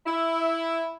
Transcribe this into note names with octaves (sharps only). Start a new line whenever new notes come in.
E4